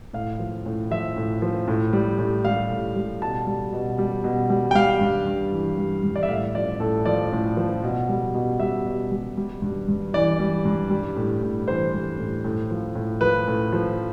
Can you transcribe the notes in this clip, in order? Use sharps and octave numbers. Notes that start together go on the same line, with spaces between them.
A2 F5
F3
A2
F3 E5
A2
F3
A2
G3
A2
G3 F5
A2
G3
B2 A5
G3
B2
G3
B2
G3
G5
G3 F5
G2
G2
E3
G3
G2
D5
E5
A2 F5
F3 D5
A2 A4
F3 D5
A2
F3
B2
G3
B2
G3 E5
B2
G3
G3
G2
G2
E3 D5
G3
G2
G3
A2
A2
E3 C5
G3
A2
A2
F3
A2
F3 B4
A2
F3